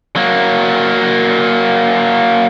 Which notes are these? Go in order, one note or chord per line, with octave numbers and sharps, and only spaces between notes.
F#3 A#3